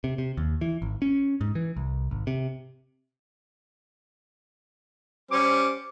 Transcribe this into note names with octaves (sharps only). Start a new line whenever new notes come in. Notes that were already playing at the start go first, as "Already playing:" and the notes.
C3
C3
D#2
E3
G#1
C#4
G#2
E3
C2
G#1
C3
G3 C#4 C5 D6